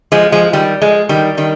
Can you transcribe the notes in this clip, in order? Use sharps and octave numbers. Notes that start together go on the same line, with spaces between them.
F3 G#3
F3 G#3
D#3 G3
F3 G#3
D#3 G3
D#3 G3